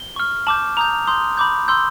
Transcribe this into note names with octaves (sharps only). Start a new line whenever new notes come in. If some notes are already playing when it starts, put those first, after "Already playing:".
Already playing: G7
C#6 F6
A5 D6 G6 F#7
A#5 D#6 G6 F7
C6 D#6 G6
B5 D6 G6
C6 E6 G6